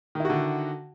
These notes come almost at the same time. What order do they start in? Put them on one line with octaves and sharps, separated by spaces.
D#3 E4 F#4 D3